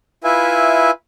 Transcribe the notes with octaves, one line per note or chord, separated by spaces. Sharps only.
E4 F4 B4 E5 G#5